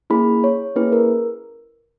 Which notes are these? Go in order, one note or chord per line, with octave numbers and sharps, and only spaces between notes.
A#3 C#4 E4 G#4 B5
C#5
A#3 C#4 E4 G#4 B4
A#4